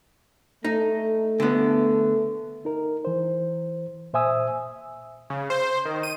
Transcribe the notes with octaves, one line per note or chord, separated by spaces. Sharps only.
A3 D#4
D3 B3
D#4 A#4
E3 C5
A#2 C5 E5 G#5 D#6 E6
C#3
C5
D#3
D#7